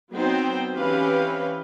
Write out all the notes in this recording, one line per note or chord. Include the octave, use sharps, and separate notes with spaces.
F#3 B3 C4 D#4 C5 G5
E3 C4 C#4 G4 B4 F5